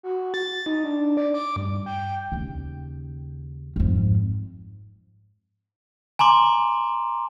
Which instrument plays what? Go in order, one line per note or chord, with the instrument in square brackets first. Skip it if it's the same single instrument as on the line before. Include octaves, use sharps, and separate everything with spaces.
[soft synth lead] F#4
A6
D#4
D4
D5
D6
G2
G5
[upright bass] D#2 C#3
F2 G#2
[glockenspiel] G#5 A#5 C6 D6